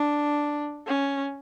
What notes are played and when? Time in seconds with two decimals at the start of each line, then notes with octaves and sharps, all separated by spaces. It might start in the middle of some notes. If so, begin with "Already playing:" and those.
Already playing: D4
0.87 C#4